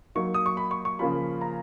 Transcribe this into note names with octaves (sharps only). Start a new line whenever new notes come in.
F#3 A#3 D#4 C#6
D#6
C#6
B5
C#6
C#6
C#3 F3 A#3 C#4 F4 B5
A#5